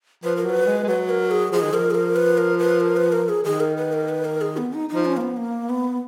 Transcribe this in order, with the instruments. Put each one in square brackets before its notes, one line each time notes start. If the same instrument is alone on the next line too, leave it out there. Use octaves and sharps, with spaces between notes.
[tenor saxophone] F3 [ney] B4
[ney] A#4
[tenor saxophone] F#3 [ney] B4
[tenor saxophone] G#3
G#3
[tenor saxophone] F#3 [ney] B4
[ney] A#4
G#4
[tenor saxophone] F3 [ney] G#4
[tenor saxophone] D#3
[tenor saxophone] F3 [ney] A#4
[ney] G#4
A#4
B4
A#4
B4
A#4
B4
A#4
G#4
[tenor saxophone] D#3 [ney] G#4
[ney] A#4
B4
A#4
B4
A#4
G#4
B3
D#4
[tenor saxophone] F3 [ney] D#4
[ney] C#4
A#3
B3
A#3
B3